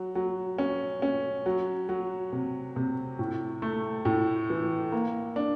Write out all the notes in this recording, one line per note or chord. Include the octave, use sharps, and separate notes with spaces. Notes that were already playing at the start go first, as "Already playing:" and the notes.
Already playing: F#3
F#3
C#4
C#4
F#3
F#3
C3
C3
A2
A3
A2
E3
A#3
D4